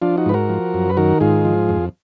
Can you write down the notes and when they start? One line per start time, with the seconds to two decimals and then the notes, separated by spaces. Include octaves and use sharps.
0.02 F3 D4 F4
0.18 D#4 F#4
0.26 G#2 B4
0.34 F#4 A#4
0.49 F3
0.74 F#2
0.89 B4
0.97 D#3 F#4 A#4
1.20 G#2 F4 G#4
1.45 F3
1.69 F2